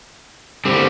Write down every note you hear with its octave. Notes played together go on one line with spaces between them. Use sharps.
D3 G3 C4